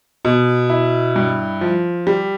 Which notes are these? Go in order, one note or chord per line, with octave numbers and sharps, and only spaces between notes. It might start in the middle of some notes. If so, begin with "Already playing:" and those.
B2
E4
G2
F3
G3